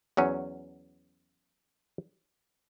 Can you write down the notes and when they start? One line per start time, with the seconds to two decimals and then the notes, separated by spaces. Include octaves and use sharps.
0.17 E2 F#3 C#4